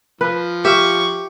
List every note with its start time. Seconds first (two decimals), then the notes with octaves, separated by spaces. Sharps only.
0.21 F3 B4
0.65 G4 E5 F5 C#6